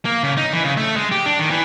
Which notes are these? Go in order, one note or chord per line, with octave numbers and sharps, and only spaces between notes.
A#3
C#3
D#4
E3
C#3
A3
G#3
G4
D4
D#3
E3